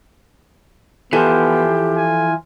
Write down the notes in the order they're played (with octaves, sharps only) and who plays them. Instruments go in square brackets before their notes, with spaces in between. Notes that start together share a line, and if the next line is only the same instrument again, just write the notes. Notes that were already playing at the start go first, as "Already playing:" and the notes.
[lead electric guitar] E3 F3 [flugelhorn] B3 [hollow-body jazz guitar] E4 A4 [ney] G4
[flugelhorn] G#5